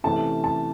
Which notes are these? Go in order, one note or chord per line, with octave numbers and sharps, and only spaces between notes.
C3 E3 A3 C#4 A5
A5